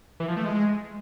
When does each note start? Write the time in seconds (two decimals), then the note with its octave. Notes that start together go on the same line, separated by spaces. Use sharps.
0.20 E3
0.28 F3
0.36 A3
0.45 G#3